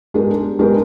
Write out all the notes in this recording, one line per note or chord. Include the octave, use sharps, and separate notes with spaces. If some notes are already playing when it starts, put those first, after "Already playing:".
G#3 B3 D4 G4 A#4
G#3 B3 D4 G4 A#4